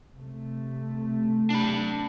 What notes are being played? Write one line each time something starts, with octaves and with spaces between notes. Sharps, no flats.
C3 A3
D4 B5